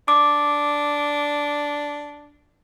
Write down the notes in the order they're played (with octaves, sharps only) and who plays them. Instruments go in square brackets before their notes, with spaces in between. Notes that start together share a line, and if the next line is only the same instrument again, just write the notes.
[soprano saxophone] D4 [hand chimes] D6